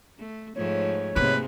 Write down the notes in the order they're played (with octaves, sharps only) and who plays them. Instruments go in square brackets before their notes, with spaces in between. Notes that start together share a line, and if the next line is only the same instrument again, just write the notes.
[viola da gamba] A3
[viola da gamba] G#2 F3 A3 [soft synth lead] C#5
[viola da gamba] G#2 C3 G#3 [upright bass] A#3 [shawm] B4